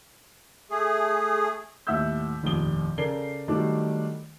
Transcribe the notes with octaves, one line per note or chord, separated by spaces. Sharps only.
A3 G#4
D#2 A2 E5 F#5 E6 G6
F1 A#1 D#2 D#6 G7
C#3 A4 A#4 D5 C7 G7
D#3 F#3 G3 A3 D4